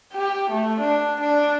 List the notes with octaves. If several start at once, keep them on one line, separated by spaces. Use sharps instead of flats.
G4
A3
D4
D4